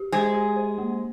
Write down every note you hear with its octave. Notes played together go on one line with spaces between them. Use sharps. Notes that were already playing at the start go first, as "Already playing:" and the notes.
Already playing: G4
G#3 G#4 C5
G4
C5
A#3